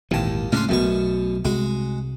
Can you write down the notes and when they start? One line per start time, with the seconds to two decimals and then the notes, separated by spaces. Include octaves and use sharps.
0.11 G#1 D#2 A#2 E3 A5
0.52 A2 C#3 G#3 C#4 D4 C6
0.69 B1 F#2 B2 F#3 A3 C#6
1.45 C2 G#3 F#4